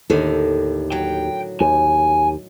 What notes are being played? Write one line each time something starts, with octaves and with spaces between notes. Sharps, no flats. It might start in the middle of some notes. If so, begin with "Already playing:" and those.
D#2 A2 D3 D#3
F#3 G5
D#2 G#5